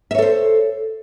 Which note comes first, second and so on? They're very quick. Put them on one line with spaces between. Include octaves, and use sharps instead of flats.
E5 C#5 A4 C5